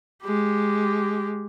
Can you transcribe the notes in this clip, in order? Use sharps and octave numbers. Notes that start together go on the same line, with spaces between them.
G#3 G4